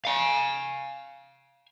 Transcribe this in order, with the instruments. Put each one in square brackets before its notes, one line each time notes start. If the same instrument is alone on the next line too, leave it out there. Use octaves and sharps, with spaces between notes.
[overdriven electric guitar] F5 G#5